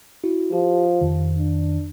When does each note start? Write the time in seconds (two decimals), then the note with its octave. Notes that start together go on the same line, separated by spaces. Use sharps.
0.24 E4 F#4
0.53 F3 G4
1.01 F2 D#3
1.38 D4